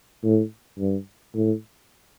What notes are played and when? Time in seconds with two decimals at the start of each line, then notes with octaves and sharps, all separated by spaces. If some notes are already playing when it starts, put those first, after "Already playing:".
0.24 A2
0.80 G2
1.35 A2